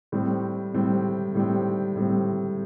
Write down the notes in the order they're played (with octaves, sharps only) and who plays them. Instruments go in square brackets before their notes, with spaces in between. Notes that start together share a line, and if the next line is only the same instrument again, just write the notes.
[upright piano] A2 G3 C4
A2 G3 C4
A2 G3 C4
A2 G3 C4